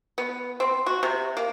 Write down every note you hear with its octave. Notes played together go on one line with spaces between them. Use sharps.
B3
C4
F#4
C3
A#3